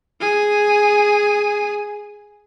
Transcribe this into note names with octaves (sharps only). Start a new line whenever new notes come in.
G#4 G#5